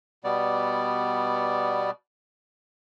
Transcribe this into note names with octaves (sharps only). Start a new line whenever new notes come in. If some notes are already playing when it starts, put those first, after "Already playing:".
B2 G3 B3 D5